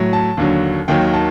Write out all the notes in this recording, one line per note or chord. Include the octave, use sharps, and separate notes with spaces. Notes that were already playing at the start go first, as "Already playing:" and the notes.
Already playing: A2 F#3
A5
D#2 D3 F#3
D#2 D#3 F#3 G5
A5